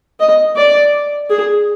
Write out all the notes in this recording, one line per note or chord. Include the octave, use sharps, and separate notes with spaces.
D#5
D5
G#4